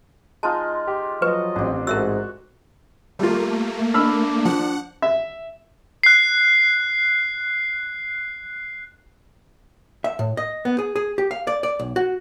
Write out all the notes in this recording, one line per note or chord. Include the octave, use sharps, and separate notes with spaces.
G#3 D#4 F4 A5
G4
F3 F#3 B4 D#5 C#6
A1 C4 D4 G4
G#2 F#4 A4 A#4 E5 E6
G3 A3 A#3 F4
D4 B5 E6 F6
F3 F#5
E5
F#6 C7
E5
A2
D#5
B3
G#4
G#4
G4
F5
D5
D5
B1
F#4